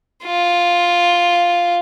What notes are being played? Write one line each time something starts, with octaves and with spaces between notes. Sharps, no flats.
F4